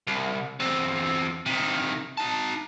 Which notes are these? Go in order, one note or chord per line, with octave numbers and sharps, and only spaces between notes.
C2
E2 C4
C3 D#3
D#4 A5